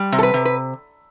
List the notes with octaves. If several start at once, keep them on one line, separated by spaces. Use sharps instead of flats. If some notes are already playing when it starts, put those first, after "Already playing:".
Already playing: G3
C3
A4
B4
C3
B4